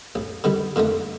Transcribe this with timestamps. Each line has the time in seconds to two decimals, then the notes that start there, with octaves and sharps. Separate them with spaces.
0.15 A1
0.44 D3 D#3 G3
0.76 A#2 D3 D#3 A3